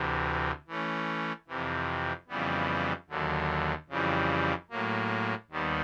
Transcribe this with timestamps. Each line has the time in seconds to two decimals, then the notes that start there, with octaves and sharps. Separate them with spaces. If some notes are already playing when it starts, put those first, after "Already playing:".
Already playing: D2 C3 E3
0.68 E3 A3 C#4
1.48 F2 C3 E3
2.28 F2 C#3 E3 G3 B3
3.09 D#2 D3 F#3
3.89 F2 C#3 E3 G3
4.70 A2 F#3 A#3
5.50 D#2 D#3 G3 B3